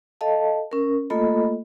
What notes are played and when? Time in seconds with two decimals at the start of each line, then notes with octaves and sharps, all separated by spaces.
0.21 A4 D#5 F5 A5
0.71 C#4 A#4
1.10 A3 A#3 F4 A4 D#5 B5